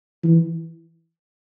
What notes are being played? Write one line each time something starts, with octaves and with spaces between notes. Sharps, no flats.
E3